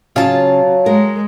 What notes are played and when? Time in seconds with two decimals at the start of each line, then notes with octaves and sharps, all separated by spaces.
0.16 C#3 F#3 F4 A5
0.86 G#3 A#4